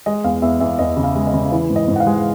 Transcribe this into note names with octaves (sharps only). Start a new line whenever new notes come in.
G#3 D#5
E2 F5
E2 E5
E2 E5
E2 D#5
C#3
F5
G#3
D#5
C#3
E3
G#2
D#5
G#2
F#5
F5
G#3